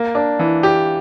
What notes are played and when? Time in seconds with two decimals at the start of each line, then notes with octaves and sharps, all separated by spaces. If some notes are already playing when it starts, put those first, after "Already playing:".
Already playing: A#3
0.15 D4
0.39 E3
0.63 G4